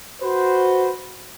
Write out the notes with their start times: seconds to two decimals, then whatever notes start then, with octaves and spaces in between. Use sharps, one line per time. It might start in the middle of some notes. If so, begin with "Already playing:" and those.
0.21 F#4 B4 C5